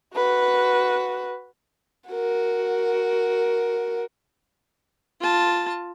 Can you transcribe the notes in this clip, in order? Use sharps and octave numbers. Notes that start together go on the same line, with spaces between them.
F#4 B4
F#4 A#4
F4 A5